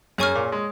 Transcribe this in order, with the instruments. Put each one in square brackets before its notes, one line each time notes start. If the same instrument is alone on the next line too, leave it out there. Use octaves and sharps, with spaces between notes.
[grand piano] F#2 [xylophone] G#4 C#5 G#5 C#6 F6
[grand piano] A#2
G#3